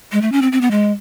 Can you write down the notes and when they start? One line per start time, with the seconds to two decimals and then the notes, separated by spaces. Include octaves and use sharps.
0.12 G#3
0.22 A3
0.32 C#4
0.42 C4
0.52 C4
0.61 B3
0.71 G#3